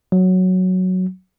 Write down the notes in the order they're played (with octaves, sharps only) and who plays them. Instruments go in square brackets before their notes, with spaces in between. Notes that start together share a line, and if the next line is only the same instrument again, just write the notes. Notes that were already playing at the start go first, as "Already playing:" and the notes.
[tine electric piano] F#3